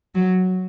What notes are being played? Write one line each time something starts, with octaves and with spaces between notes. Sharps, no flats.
F#3